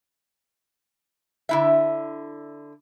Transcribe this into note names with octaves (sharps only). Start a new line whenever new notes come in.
D3 E4 E5